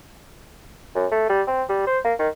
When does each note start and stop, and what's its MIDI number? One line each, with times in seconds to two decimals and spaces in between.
0.95 1.07 42
1.12 1.25 57
1.29 1.42 55
1.47 1.63 60
1.69 1.82 55
1.87 1.99 72
2.05 2.14 58
2.19 2.29 51